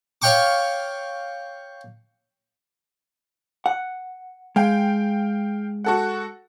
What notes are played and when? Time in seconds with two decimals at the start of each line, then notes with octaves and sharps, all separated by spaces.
0.22 C#5 F5 G5 C#6 D6
3.66 F#5
4.56 G#3 F5 G5
5.84 F#4 A4 F#5